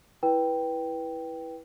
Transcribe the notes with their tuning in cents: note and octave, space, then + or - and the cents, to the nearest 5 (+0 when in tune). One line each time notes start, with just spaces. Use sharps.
E4 +0 B4 -15 G5 +0